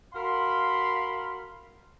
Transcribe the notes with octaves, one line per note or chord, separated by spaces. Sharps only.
F#4 A#4 F5 B5 C6